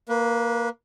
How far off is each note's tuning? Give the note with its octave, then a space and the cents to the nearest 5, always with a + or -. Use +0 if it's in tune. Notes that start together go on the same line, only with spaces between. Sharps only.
A#3 +0 B4 -25